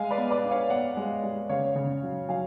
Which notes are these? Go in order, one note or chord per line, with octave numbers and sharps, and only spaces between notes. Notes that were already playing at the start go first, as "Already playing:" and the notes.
Already playing: G#3 F5 G#5
B4 D5
B3
B4 D5
D4
C#5 F5
B3 D5 F#5
G#3
G#3
C#3 C#5 F5
C#3
F#3
F#3 F5 G#5